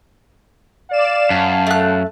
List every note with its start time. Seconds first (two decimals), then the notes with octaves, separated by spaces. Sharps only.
0.91 D5 F5 E7
1.30 F#2 A5
1.67 A3 F#6